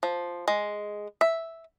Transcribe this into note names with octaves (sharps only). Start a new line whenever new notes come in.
F3
G#3
E5